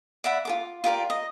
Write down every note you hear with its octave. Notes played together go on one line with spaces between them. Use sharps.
D5 E5 F#5 B5
F4 A4 D6
F4 G4 A#4 D5
D#5